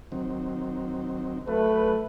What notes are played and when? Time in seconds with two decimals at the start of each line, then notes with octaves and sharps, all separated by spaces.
0.12 D#3 F#3 C4
1.48 F#3 A3 B4